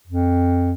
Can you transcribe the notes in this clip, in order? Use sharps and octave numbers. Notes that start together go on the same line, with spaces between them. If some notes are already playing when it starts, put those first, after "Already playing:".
F2